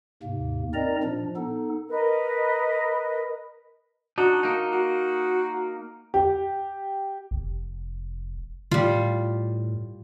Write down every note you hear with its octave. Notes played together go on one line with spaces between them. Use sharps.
D#2 G#2 C3 A#3
C4 D#4 A#4 D5 D#5 A#5
A#2 F3 D4
B3 D#4 A4
A#4 B4 D#5
D4 D#4 F#4
A#3 D#4
F#4
G4
F1
A2 G3 F4